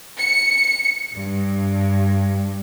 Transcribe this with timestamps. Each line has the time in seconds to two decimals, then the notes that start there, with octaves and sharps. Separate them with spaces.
0.18 C#7
1.13 G2